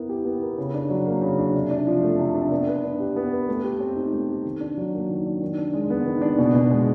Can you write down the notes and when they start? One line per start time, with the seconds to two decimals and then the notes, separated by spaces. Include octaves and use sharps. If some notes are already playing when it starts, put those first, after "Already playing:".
Already playing: B3 E4 A#4
0.09 G4
0.25 B3
0.41 A#4
0.57 C#3
0.74 D4
0.90 F#3
1.06 A#3
1.21 C#3
1.38 D4
1.54 C3
1.71 D4
1.87 F3
2.03 A3
2.19 C3
2.35 D4
2.51 B3
2.67 B4
2.83 D4
3.00 G4
3.16 B3
3.32 B4
3.48 A3
3.64 G4
3.80 C4
3.96 D#4
4.12 A3
4.29 G4
4.45 D#3
4.60 D4
4.77 F#3
4.93 A#3
5.09 D#3
5.26 D4
5.41 D#3
5.58 D4
5.74 G#3
5.90 B3
6.05 D#3
6.21 D4
6.38 B2
6.54 B2
6.70 G#3